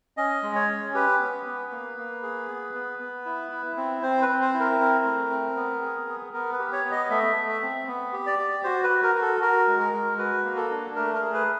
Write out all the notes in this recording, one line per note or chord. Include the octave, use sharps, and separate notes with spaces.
C#4 D#5
G#3
C#5
C#4
G4 B4
B3
B3
A#3
A#3
G#4
B3
B3
B3
E4
E4
C4
C4 C5
B4
C4
C5
E4
A#4
C4
A3
C4
B3
G#4
B3
B3 A#4
B4
G4
C#5
B3
D#5
A3 E5
A3
E5
C4
B3
G4
D5
G4
F#4 C5
B4
F#4
A#4
F#4
A4
F#4 A#4
G#3
A#4
G#3
F#4 B4
A#3
A4
D4
A3 A#4
A#4
G#4
B4